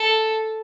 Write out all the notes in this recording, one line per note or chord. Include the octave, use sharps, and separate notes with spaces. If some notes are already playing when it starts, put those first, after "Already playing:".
Already playing: A4